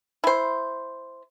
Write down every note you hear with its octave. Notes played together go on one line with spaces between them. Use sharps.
E4 C5